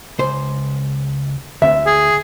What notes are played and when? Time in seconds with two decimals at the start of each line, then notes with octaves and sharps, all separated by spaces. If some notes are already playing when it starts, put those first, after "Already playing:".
0.19 C#2 C5
1.62 D2 E5
1.86 G#4